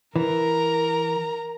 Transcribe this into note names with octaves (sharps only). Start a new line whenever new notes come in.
E3 A#4 A#5